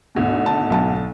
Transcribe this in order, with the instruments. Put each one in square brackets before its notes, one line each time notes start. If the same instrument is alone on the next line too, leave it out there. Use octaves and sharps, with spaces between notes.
[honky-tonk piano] G#1 D2 B2
[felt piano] A5
B1 A5